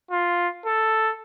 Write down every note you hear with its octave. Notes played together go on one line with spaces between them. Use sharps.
F4
A4